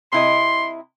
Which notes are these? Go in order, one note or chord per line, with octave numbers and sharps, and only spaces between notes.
C3 E4 D#5 C6